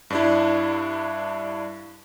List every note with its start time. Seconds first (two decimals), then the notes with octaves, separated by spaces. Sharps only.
0.10 G2 D4 E4